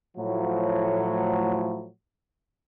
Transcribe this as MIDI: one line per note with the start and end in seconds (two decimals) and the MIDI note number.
0.17 1.87 45
0.17 1.87 53
0.17 1.87 54